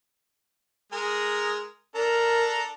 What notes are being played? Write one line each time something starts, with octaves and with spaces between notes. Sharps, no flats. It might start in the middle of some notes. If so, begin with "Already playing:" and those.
G#3 G#4 A#4
D4 A4 A#4 A#5